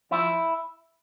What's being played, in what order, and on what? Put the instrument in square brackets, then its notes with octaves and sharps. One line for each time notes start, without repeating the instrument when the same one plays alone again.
[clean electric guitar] F3 E4